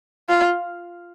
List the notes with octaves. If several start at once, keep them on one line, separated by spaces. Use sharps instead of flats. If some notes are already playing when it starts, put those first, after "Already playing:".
F4